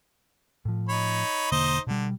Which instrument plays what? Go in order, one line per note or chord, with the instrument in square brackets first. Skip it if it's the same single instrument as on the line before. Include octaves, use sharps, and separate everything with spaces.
[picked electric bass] A2 F3
[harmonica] D#4 C#5 B5
[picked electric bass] E1 D3 A#3 [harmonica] D#4 C5 D#5
[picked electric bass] B2 G3 [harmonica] D3